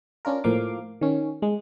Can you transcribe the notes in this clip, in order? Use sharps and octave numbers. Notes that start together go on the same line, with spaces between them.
C#4 D4 F4 A#4
A2 F3 A#3 F5 D6
D#3 C#4
G#3